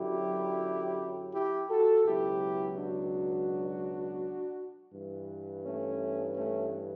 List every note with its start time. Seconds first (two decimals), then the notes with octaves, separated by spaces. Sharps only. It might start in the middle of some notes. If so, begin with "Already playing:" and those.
Already playing: F#2 D3 F#3 E4 G4
1.34 E4 G4
1.69 F#4 A4
2.05 C#2 B2 F#3 E4 G4
2.76 D4 F#4
4.92 G2 E3
5.63 A3 C#4
6.35 A3 C#4